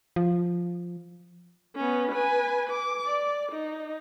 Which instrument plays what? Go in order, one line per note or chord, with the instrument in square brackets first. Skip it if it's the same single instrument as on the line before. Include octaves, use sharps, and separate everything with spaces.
[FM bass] F3
[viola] B3 C#4
B4 G#5
D6
D5
D#4